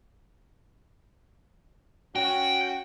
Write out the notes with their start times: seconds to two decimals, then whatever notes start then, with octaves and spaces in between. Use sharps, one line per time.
2.16 C#4 F#4 G5